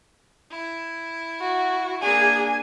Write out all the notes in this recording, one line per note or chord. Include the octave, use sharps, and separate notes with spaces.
E4
F#4
A#3 D4 G#4 G#5